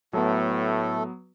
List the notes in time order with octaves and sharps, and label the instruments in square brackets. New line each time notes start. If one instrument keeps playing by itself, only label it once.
[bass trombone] A2 [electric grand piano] F#3 B3 [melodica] A3 A4